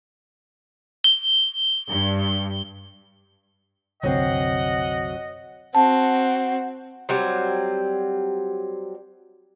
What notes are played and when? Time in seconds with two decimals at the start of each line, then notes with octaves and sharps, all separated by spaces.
1.04 G7
1.89 G2
4.03 F#1 C2 D3 F#3 C4 D#5 F#5
5.75 C4 F#4 F#5 A5
7.09 F#3 G3 C4